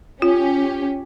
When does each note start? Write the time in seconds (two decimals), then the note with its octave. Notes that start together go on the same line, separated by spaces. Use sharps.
0.22 C#4 F4 G4